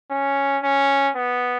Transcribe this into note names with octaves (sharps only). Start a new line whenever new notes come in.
C#4
C#4
B3